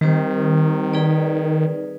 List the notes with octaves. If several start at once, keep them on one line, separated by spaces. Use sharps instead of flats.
D#3 G3 C4 G4 C5
D#4 G#4 B4 D5